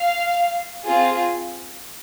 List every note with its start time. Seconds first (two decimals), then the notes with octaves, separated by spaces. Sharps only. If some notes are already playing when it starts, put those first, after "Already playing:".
Already playing: F5
0.83 C4 F4 G#4